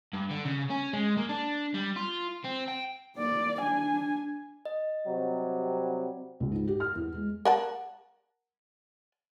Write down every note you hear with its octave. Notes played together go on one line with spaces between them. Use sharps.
G2
D3
C#3
C#4
G#3
A#3
D4
G3
F4
C4
G5
A#3 D5
D4 G#5
D#5
C3 F#3 G3
C#2
G#2
G4
F6
E2
G#3
A#4 F#5 A5